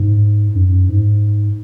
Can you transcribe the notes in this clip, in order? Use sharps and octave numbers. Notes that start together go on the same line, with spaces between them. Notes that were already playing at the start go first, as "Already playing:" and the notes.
Already playing: G#2
F#2
G#2